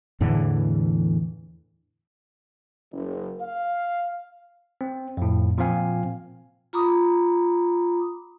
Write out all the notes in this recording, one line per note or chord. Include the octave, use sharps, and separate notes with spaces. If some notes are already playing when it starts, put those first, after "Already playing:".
E2 A2 D3 E3
F#1
F5
C4
F2 A2
A#2 F3 C4 F5 G#5
F4 A#5 B5 D6 D#6